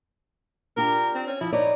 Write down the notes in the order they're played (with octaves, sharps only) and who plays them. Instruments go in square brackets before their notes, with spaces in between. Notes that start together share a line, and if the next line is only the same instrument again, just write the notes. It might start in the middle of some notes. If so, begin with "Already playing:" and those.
[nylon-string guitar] D4 F4 G4 [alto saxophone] A#4
[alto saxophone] C4
C#4
[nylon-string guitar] F3 [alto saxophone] E4
[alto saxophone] D#4 [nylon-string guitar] B4 C#5 D5